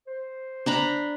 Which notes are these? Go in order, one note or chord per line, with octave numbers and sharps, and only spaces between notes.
C5
D4 A#5 B5